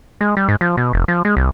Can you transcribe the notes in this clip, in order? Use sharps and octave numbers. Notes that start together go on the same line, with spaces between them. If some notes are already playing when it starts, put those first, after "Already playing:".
G#3
G3
G#2
F3
B2
F1
F3
G#3
C2